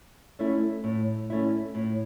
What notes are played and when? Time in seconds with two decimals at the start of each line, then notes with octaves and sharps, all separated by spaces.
0.39 A3 C#4 E4
0.84 A2
1.30 A3 C#4 E4
1.75 A2